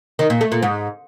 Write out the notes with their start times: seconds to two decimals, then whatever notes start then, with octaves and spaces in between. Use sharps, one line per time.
0.19 D#3
0.30 A#2
0.41 A3
0.52 A#2
0.62 G#2